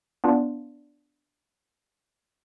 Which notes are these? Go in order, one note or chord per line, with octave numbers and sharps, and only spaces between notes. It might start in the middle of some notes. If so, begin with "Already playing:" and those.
B3 D4 F4